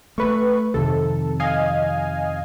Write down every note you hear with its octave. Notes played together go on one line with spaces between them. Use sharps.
A3 B4 C#6
F2 C3 D#3 A4
D#5 F5 G#5